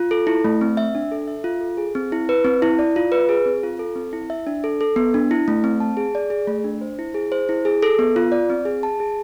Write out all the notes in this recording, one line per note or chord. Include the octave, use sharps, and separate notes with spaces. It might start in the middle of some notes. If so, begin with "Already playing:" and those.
Already playing: F4
A4
E4
A3
C4
E5
D4
A4
E5
F4
A4
G#4
C4
E4
B4
C4
E4
D5
F4
B4
G#4
C4
F4
A4
C4
E4
E5
D4
A4
A4
B3
D4
E4
A3
C4
A5
G#4
D5
G#4
A3
D4
C5
E4
G#4
C5
E4
G#4
A4
B3
F4
D5
C4
G#4
A5
G#4